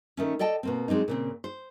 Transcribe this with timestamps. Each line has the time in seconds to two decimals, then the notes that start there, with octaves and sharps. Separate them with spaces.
0.17 D#3 A3 C#4
0.39 A4 D5 D#5 G5 A5
0.63 B2 A#3 C4
0.88 F#3 G#3 C4 D4 D#4
1.08 A#2 C#3 C4
1.44 C5